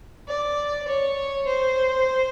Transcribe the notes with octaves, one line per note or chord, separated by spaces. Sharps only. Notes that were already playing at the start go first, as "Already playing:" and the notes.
D5
C#5
C5